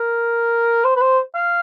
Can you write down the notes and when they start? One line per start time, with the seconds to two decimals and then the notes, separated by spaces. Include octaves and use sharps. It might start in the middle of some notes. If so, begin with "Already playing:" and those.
Already playing: A#4
0.84 C5
0.96 B4
1.01 C5
1.35 F5